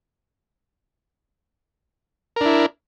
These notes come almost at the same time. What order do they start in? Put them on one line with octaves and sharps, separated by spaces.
A#4 D4 E4